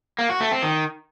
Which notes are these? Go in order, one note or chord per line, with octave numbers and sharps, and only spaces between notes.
A#3
F#4
A3
C4
D#3